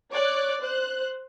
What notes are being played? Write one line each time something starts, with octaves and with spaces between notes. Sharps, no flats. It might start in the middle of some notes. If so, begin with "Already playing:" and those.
C#5 D5 D6 F#6
C5 F#6